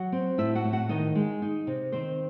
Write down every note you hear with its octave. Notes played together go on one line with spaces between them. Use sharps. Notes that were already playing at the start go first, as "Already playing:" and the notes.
Already playing: F#3 F#4 F#5
C4
A2 E4 E5
F#4 F#5
A2
F#4 F#5
D#3 D#4 D#5
G#3
D#4
C3
D#3 C4 C5